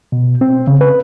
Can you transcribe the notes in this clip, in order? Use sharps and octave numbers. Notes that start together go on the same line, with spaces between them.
B2
C4
C#3
B4